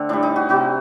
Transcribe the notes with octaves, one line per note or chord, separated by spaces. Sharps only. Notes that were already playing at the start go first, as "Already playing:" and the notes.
Already playing: D3 A3 C4
A2 G3 D4
D#4
F#4
C3 G3 F#4